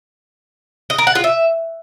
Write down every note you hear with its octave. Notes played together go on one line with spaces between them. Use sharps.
D#5
A#4
F#5
F4
E5